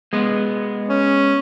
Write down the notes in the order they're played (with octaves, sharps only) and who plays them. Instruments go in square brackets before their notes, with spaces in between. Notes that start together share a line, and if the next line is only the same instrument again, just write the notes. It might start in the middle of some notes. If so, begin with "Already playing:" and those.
[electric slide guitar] G#3 B3
[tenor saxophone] C#4